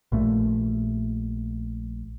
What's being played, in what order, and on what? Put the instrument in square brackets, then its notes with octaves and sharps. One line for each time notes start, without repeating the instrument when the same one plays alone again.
[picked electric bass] A#1 A#2 A3